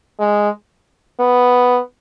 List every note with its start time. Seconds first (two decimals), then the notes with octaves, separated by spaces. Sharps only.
0.19 G#3
1.20 B3